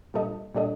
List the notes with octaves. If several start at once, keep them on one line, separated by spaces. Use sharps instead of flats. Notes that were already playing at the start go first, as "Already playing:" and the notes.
A#2 G3 D4 A4 D#5
A#2 G3 D4 A4 D#5